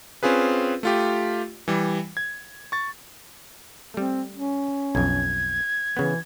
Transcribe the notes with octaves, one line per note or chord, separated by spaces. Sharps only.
C4 C#4 F4 G#4 B4
A3 F4 G4
E3 G3
G#6
C#6 A6
G3 A3 C4
C#4
B1 F2 G#6
C#3 E3 B3